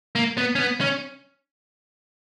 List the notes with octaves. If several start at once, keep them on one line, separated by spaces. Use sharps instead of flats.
A#3
B3
C#4
B3
C#4